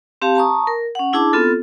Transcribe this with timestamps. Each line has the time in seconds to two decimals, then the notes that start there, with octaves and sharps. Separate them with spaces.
0.22 C4 G4 F5 A5
0.35 A5 A#5 C#6 D#6
0.67 A#4
0.95 C#4 F#5
1.13 D4 E4 G#4 A5 D6
1.33 B3 C4 F4 A4